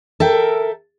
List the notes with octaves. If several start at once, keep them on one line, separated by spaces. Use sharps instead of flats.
A4 A#4 E5 G5